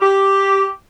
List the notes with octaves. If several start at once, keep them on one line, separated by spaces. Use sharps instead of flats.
G4